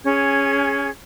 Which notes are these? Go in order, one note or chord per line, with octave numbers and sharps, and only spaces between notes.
C#4 G#4 G#6